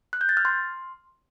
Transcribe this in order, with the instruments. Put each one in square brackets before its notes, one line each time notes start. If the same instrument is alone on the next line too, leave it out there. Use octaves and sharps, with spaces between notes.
[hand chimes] F#6
G6
A6
F6
C6